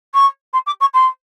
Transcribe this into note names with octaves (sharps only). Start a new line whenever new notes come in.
C#6
C6
D6
C#6
C6